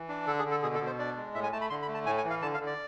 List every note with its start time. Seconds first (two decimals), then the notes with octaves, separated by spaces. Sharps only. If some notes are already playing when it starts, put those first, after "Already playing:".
Already playing: E3
0.08 D4
0.27 D3 A4
0.39 G#4
0.45 D3
0.51 A4
0.62 B2 G#4
0.75 A4
0.80 B2
0.86 C5
0.99 D4 D5
1.16 G#3
1.34 A2 E5
1.43 G#5
1.52 A3 A5
1.61 B5
1.70 D3 C6
1.82 B5
1.88 A3
1.95 A5
2.06 A2 G#5
2.18 G#5
2.24 E3
2.30 F5
2.42 D3 A5
2.54 F5
2.60 D3
2.67 D5